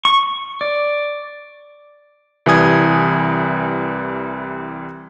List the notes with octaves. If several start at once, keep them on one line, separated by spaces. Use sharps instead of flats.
C#6
D5
C2 E3 G3 G#5 D#6 G#6